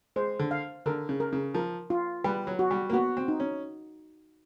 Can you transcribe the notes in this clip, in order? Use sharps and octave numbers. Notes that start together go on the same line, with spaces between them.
G#3 C5
D3
F5
D3 A#4
C#3
A#4
C#3
F3 A#4
F4
G3 B4
F#3
F#4
G3
A#3
B3 F#4
C4
D#4
C#4